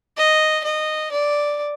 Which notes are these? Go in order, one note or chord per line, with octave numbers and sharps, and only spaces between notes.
D#5
D#5
D5